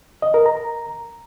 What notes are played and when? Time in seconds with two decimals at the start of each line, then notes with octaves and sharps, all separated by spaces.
0.22 D#5
0.34 A#4
0.46 A#5